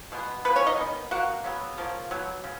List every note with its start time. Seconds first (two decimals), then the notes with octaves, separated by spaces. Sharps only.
0.12 B2 G#3 B3
0.45 B2 A#3 B3 B4
0.56 C#4 C#5
0.66 D#4 D#5
0.78 D#3 G#3 B3
1.11 B2 A#3 F#4 F#5
1.44 C#3 F#3 B3
1.78 C#3 F3 A#3
2.11 B2 F#3
2.44 C#3